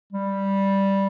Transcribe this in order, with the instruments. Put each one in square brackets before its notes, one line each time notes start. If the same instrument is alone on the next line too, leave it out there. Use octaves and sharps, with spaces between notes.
[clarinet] G3